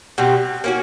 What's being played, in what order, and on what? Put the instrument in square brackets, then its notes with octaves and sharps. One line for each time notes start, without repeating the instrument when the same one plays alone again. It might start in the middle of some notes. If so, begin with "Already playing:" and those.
[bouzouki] B2 G3 C4
A#3 C#4 F#4